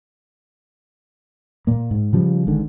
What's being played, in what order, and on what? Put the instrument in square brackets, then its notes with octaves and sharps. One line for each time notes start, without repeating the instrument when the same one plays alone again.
[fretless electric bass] A#2 A#3
G#2
C#3 F3 G3
G#1 G#2 D3